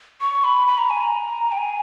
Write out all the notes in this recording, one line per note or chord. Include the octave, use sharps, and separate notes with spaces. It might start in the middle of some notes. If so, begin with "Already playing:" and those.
C#6
B5
B5
A#5
G#5
A#5
G5
G#5